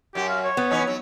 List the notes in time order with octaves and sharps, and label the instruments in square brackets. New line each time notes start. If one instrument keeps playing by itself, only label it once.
[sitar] F#2 F#4 [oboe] G4
[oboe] F5
C#5
[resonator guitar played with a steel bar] B3
[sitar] E3 C#4 D#4
F#3